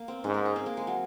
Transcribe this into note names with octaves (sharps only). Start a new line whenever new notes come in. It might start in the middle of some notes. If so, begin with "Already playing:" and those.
Already playing: A#3
C4
G#2 C#4
A#4
G#4
C4
A#3
G#3
F#3